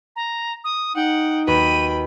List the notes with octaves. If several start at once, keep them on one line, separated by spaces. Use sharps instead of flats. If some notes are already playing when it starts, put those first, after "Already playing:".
A#5
D#6
D#4 F#5 G5
D#2 F#4 B4 G5 B5 D#7